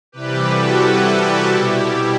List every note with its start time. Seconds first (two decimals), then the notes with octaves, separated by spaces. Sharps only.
0.12 C3 E3 G3 G4 B4
0.46 F#4 A4
0.81 E4 G4
1.50 B2 G3